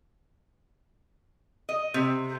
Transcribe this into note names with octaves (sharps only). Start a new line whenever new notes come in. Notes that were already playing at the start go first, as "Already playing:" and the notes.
D#5
C3